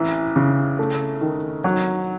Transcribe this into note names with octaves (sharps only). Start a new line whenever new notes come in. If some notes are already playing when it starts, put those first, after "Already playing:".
Already playing: A1 E3
C#3
A3
D#3
F#3